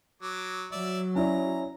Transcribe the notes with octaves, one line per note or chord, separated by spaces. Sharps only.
F#3 D6
F#3 D5 E5
C#4 E4 D5 A#5